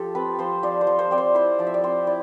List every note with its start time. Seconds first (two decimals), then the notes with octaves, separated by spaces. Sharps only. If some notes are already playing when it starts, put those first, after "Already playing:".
Already playing: F3 F4 G4 A4
0.15 C4 B4
0.39 F3 C5
0.63 F3 D5
0.81 C5
0.87 F3
0.99 C5
1.11 C4 D5
1.18 C5
1.35 E4 C5
1.59 F3 D5
1.67 E5
1.74 D5
1.84 C4 C5
2.07 E4 D5